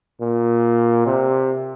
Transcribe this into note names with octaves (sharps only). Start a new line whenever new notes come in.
A#2
C3